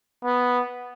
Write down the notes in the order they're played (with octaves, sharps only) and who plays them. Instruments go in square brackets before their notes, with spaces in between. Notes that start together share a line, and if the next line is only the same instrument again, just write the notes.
[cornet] B3